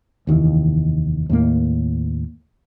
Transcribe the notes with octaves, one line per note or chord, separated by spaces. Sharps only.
F1 D#2 D#3 E3
D#2 A2 A#3